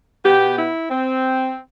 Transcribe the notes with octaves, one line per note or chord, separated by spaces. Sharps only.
B2 B3 G4
E4
C4